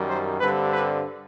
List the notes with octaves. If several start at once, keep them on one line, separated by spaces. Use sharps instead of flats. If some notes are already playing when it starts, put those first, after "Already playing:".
Already playing: F#2 D#3 G3
C5
G2 D3 G3 C4 B4
B4